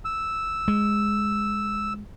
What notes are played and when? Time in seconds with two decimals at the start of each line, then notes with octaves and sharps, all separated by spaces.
0.05 E6
0.68 G#3